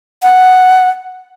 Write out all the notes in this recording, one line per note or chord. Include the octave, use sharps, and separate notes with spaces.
F#5